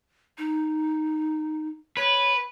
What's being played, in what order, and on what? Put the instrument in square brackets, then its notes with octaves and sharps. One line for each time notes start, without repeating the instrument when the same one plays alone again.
[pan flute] D#4
[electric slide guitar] B4 [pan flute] C#5